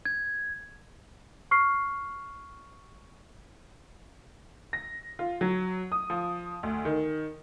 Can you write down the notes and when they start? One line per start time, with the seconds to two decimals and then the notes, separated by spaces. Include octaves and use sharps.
0.05 G#6
1.51 C#6 F6 C7
4.73 A#6
5.19 F4
5.41 F#3
5.92 D#6
6.10 F3
6.63 D2
6.85 D#3